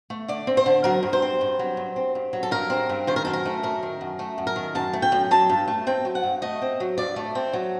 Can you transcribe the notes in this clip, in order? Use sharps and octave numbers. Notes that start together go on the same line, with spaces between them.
A3
D3 D5
C4
C5
D3
F#3 A#4
G2
C5
C4
G2
F#3
G2
C4
G2
F#3
A4
G2 A#4
C4
G2
D#3 C5
A#4
F#2 A4
A#4
A3
F#2 A#4
D#3
F#2
A3
F#2
A#4
D#3
F#2 A5
A3
G5
F#2
F#3 A5
G2
A3
C4 G5
F#3
F#5
G2
A3 D#5
C4
F#3
G2 D5
A3
C4
F#3